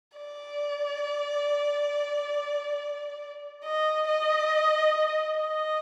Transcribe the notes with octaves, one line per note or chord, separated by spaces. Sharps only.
D5
D#5
D#5
D#5